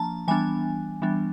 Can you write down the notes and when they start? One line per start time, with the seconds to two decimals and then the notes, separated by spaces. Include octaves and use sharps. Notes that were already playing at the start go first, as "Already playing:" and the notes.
Already playing: F3 A#3 D4 A5 A#5
0.28 E3 G3 B3 D4 G#5
1.02 E3 G3 B3 D4